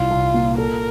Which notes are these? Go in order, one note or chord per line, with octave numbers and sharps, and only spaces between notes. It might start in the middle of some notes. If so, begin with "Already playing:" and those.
Already playing: C2 F4
C2
A#2
A4 A#4